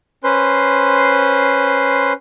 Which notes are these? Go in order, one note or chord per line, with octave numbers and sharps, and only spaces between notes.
C#4 B4 C5 C6